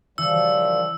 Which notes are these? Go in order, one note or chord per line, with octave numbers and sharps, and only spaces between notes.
F#2 E3 F3 G3 E6